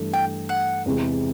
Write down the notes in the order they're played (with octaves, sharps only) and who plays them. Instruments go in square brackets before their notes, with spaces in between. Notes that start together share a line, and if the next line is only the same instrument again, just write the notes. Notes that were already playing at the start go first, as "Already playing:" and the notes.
Already playing: [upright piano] G2 E3 A3
[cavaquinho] G5
F#5
[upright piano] E2 C3 E3 G#3